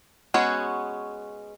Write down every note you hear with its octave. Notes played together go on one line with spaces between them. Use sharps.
G#3 B3 C#4 F#4 G#4